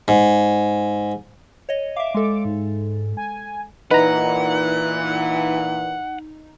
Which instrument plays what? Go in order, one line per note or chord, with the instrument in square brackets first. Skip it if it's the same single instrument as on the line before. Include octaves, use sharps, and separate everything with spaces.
[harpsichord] G#2
[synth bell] C#5 D#5
[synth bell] E5 F5 [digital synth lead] D6
[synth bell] G#3 A4
[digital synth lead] G#2
G#5
[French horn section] A#2 E3 [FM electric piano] D#4 [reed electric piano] B4 A#5 [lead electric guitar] F#5